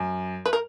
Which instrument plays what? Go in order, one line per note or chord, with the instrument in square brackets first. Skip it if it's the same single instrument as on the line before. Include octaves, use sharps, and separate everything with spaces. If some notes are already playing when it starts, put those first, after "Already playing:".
Already playing: [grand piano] F#2
[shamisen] B4
A#4